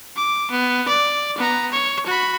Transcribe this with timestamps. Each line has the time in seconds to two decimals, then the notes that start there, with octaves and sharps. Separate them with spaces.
0.16 D6
0.51 B3
0.88 D5
1.38 B3 A#5
1.72 C#5
2.06 F#4 B5